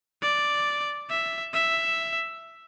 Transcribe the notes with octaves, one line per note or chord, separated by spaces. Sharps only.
D5
E5
E5